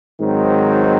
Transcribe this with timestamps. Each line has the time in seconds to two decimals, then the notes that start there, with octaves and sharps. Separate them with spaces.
0.20 G#2 D#3 F#3 C4 D#4